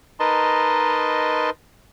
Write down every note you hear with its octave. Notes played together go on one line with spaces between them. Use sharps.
D#4 A#4 B4 D#5 A5 C6